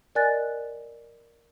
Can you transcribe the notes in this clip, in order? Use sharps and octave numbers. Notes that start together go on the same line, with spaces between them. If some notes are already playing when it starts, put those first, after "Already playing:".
A#4 D5 D#5 G#5 F#6 A6